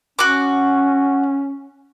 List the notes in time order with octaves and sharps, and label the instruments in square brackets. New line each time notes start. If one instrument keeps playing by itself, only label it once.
[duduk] C#4 [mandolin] F#4 D6